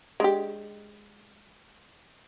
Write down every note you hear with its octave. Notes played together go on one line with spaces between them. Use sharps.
G#3 D4 G4